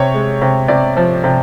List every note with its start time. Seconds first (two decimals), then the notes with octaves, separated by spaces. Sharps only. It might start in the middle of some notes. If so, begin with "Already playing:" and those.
Already playing: C3 C#5
0.14 G#3
0.42 C3
0.68 C3 D5
0.97 F3
1.24 C3